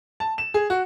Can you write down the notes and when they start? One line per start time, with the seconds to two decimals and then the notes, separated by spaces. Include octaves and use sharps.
0.20 A5
0.38 E7
0.54 G#4
0.70 F#4